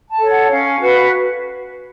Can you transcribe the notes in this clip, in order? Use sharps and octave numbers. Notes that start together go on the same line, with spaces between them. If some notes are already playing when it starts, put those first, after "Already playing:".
A5
A4 C#5
F#5
C#4 F5
F#4 B4